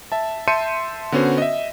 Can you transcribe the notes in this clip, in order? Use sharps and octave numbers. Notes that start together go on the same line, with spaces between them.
E5 A5
E5 A5 C6 G6 C#7 D#7
D3 B3 C#4 F#4 C5
D#5 E5